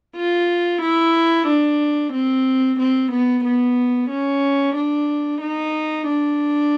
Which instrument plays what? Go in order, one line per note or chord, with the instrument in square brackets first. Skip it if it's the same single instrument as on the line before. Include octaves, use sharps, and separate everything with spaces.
[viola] F4
E4
D4
C4
C4
B3
B3
C#4
D4
D#4
D4